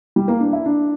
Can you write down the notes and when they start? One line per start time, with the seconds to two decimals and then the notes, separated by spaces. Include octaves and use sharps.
0.16 G3
0.28 A#3
0.40 D4
0.53 E4
0.66 D4